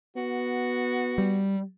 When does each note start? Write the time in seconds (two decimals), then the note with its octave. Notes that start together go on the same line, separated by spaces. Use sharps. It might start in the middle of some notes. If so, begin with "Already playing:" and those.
0.17 B3 F#4
1.18 G3